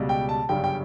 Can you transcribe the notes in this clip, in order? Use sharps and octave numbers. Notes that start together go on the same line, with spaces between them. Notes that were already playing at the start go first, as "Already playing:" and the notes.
Already playing: C#2 B2 G3
G5
A5
G1 F#2 C#3 G3 G5
G5